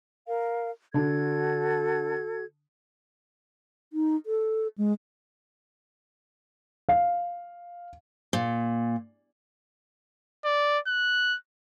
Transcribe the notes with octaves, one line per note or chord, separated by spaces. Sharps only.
A#4 F5
D3 D4 F#4 A4 G#6
D#4
A4
G#3
F5
A#2
D5
F#6